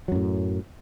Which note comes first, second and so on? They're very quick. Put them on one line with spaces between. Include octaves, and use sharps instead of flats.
F#3 F#2 A2